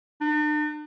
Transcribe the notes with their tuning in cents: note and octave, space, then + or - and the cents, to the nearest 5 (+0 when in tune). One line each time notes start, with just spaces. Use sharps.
D4 +45